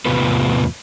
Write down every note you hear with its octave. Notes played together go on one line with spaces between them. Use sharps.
E2 A2 C3 B3 F4 B4